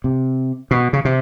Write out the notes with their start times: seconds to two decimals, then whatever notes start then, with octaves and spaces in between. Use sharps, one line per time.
0.04 C3
0.71 B2
0.93 C#3
1.05 C3